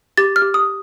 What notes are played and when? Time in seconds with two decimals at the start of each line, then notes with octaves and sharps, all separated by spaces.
0.17 G4 A6
0.36 F6
0.42 G4
0.54 D#6